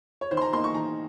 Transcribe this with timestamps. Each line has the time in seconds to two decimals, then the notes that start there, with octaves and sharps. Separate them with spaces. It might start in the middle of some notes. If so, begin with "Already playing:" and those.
0.21 C#5
0.31 D#3 C5
0.37 C6
0.42 A#5
0.52 A#3 D#4 C6
0.64 C#6
0.74 D#3 A#5